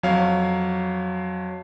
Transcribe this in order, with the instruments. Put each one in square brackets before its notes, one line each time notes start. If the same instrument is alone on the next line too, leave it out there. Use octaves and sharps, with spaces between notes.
[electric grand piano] F2 F#3 C#5 F5